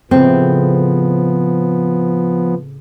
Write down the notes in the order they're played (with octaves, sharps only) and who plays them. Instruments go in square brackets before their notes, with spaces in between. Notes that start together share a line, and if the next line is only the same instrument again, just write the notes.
[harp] A2 C#3 [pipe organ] F3 B3 [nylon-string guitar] C4